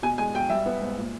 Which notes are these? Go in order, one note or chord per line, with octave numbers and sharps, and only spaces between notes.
B2 G#5
G#3 G#5
B1 G5
G3 E5
B3
G#2
A#2